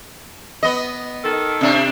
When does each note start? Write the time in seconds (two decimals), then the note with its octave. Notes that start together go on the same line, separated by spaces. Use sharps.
0.63 B3 D#5
1.24 D#3 A4
1.61 C3 D4